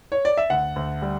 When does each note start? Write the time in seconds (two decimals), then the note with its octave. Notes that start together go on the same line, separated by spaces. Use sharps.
0.12 C#5
0.25 D5
0.37 E5
0.50 D2 F#5
0.76 D2
1.02 G3